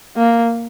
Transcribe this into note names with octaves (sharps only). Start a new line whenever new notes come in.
A#3